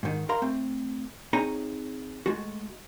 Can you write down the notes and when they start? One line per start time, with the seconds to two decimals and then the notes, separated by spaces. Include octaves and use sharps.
0.03 G#2 D#3
0.29 A#4 F5 A#5 C6
0.42 A3 C4
1.33 C4 D#4 G#4 C#5 G#5 A#5
2.26 G#3 A3 F#4